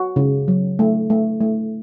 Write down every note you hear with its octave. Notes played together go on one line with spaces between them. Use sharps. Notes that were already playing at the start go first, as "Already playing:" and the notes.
Already playing: F#4
C#3
F#3
A3
A3
A3